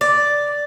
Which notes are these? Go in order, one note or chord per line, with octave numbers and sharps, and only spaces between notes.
D5